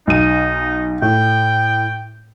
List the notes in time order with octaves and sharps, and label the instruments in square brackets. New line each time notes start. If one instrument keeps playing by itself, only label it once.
[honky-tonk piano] B1 D#7 [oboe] D#4
[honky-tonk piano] A2 [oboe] G5